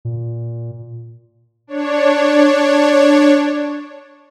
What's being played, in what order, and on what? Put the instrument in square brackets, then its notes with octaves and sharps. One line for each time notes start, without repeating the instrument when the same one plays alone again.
[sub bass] A#2
[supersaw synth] D4 C#5